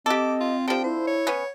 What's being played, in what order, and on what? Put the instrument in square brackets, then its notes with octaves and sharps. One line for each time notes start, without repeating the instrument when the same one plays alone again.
[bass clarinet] C4 [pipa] G4 A4 [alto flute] D#5 [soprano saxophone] D6
[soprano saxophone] F4
[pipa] D3 F3 [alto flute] G4 [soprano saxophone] G5
[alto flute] E4 [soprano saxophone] C5
[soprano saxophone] C#5
[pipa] B3 C#4